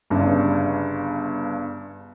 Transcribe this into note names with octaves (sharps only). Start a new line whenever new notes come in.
G1 G2 C#3